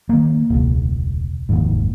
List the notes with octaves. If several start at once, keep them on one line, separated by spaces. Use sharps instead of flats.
D#3 A#3
E1 C#2
F1 D#2 G#2